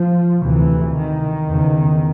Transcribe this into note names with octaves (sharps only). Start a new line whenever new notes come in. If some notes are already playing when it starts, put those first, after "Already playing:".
Already playing: F3
D2 C3 E3
D#3
E2 C#3